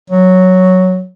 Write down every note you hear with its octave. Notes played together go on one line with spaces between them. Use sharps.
F#3